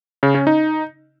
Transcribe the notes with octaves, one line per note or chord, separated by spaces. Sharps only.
C#3
C#4
D#4